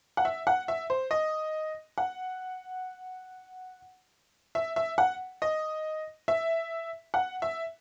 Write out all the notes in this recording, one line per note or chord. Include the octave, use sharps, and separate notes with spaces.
F#5
E5
F#5
E5
C5
D#5
F#5
E5
E5
F#5
D#5
E5
F#5
E5